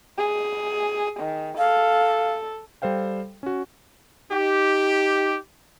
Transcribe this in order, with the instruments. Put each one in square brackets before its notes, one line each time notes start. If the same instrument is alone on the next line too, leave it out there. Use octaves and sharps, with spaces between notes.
[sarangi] G#4
D#3
[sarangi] A4 [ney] F5
[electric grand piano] G3 A4 C5 F5 G5
C#4 F#4
[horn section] D#4 G4